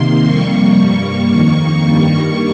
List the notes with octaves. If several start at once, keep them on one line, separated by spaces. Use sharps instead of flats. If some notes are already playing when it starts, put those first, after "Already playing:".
Already playing: C3 D#3 A#3 C6
F2 C3 G3 A#3 C#6
G2 G3 A#3
F2 D#3 A#3 C#6
G2 D#3 G3 A#3